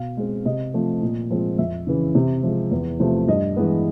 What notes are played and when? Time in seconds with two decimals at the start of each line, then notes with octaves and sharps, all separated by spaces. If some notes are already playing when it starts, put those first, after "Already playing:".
Already playing: B2 F5
0.17 G#3 C4
0.45 C3 D#5
0.74 F3 A3 C4
1.02 A#2
1.30 F3 G#3 C4
1.58 F2 E5
1.87 C#3 E3
2.15 C3
2.43 F3 G#3
2.71 E2
3.00 C3 F3 A3
3.28 G2 D#5
3.56 E3 G#3 B3